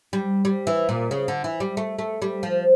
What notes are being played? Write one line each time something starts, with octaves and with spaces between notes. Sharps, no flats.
G3
G3
E3
A#2
C#3
D3
E3
G3
A3
A3
G3
F3